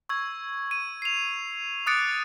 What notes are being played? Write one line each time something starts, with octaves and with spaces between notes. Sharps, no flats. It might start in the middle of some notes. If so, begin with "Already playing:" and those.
C#6 E6 G#6
D#7
C7 F7
D6 D#6 F#6 A6 C#7 D7